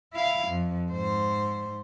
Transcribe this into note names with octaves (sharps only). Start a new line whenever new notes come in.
E4 F5
F2
G#2 C5